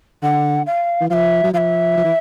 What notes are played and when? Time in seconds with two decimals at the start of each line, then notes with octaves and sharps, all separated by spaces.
0.23 D3 F#5
0.66 F5
1.01 E3
1.10 F3 F5
1.14 E5
1.44 F#3
1.53 F3 F5
1.57 E5
1.97 F3
2.04 E3